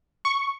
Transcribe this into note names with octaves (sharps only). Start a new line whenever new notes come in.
C#6